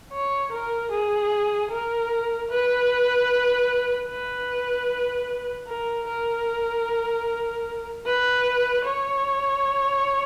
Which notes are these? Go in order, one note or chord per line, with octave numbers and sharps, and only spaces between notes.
C#5
A#4
G#4
A#4
B4
B4
A#4
A#4
B4
C#5